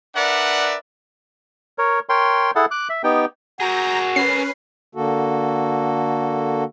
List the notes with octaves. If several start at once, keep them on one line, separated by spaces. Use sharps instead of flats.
D4 A#4 B4 D5 E5 F#5
A#4 C#5
A#4 C#5 G5 C6
E4 G#4 A4 F#5 A5
D6 F#6
E5
B3 D#4 G4 G5
F#4 G#4 A#4 A#5 G6 A#6
C#4 B4 C7
D3 A#3 F#4 A4